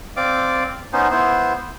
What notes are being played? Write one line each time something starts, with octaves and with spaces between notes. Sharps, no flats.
C4 D5 F5 D6
B3 C#4 D#4 C5
B3 E4 C5